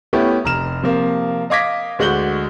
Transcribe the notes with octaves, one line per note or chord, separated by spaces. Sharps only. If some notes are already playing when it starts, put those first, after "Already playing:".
A3 B3 C#4 E4 G4
F1 A#5 F6 E7
C3 F3 A#3
D#5 F5 D6 G#6 A#6 B6
D2 G#3 F#4 G6 F#7 G7